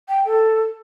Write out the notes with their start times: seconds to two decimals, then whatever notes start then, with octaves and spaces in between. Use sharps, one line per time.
0.08 G5
0.26 A4